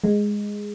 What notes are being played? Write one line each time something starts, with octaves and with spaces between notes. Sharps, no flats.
G#3